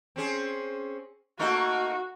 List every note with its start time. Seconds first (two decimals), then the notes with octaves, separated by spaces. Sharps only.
0.16 C4 C#4 G#4
1.39 A3 A#3 D#4 F#4